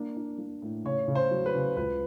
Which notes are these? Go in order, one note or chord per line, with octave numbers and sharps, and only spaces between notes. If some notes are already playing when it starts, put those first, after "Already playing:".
Already playing: A#3 D4
D4
A#3
A2
C#3 C#5
C#3
C5
F#3
B4
C#3
C#2 B4